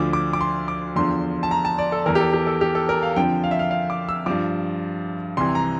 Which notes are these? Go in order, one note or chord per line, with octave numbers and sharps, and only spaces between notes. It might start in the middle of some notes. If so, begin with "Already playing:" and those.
Already playing: D2 D3 F3 D6
D6
D6
C6
D6
E2 D3 F3 C6
A5
A#5
A5
D5
A4
E2 E3 A#4
G4
A4
G4
A4
G4
A4
A#4
F5
F2 D3 F3 G5
F5
E5
F5
F5
D6
E6
G2 F3 D6
C2 C3 E3 C6
A#5